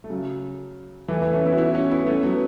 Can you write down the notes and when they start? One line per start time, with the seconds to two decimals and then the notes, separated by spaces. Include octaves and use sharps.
0.04 A3
0.10 C#3 F#3
1.08 E3 A3
1.22 E3 A3
1.33 A3 C#4
1.46 B3 E4
1.52 F#4
1.57 B3 E4
1.74 C#4 F#4
1.91 B3 E4
2.07 A3 C#4
2.23 F#3 B3